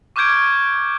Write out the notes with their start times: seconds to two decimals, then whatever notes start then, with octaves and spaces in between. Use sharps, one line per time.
0.16 C#6 D6 F6 G6 G#6 D7